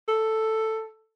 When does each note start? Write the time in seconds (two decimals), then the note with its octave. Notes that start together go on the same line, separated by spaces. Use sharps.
0.08 A4